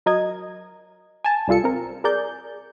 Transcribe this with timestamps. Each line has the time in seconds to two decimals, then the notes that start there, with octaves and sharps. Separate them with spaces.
0.06 F#3 A#4 D#5 G#6
1.24 G#5 A5
1.48 C2 G3 F4 A4 C#7
1.64 C4 A#4
2.04 G#4 A#4 D5 G6